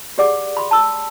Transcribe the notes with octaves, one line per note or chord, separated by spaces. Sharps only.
G4 G#4 D5 F#5 D6
B5 C6
A5 E6